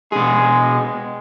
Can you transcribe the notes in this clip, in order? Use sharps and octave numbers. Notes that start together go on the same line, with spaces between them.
B2 G#3 G#4